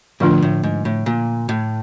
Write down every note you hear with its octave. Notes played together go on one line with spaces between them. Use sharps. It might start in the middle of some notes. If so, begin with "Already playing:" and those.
A2 D3 F3 A3 D4 F4
A2
G#2
A2
A#2
A2